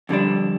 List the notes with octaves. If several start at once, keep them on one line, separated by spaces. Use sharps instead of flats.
F2 D3 G3 D4